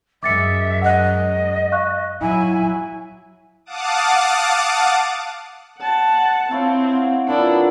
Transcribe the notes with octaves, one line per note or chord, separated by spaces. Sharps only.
F#2 G#3 E5 D6 A6 C#7
D#5 F#5 F#6
F5 C#6 F#6
F#3 E4 G#5
F5 F#5 A5 D6 D#6
F#5 A5
C4 E4 C#5 F5
F5 F#5
A#2 D#3 B3 D4 E4